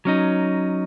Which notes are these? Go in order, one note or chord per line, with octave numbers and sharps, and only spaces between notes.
F#3 C#4 D#4